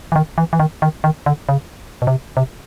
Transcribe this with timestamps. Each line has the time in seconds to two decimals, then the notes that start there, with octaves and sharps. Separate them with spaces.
0.12 E3
0.16 D#3
0.38 E3
0.53 E3
0.60 D#3
0.82 D#3
1.04 D#3
1.26 D3
1.49 C#3
2.02 B2
2.07 C3
2.37 C3